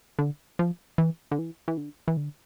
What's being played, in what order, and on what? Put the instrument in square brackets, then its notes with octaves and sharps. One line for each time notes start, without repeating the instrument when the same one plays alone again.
[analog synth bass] D3
F3
E3
D3
E3
E3
D3
E3
D3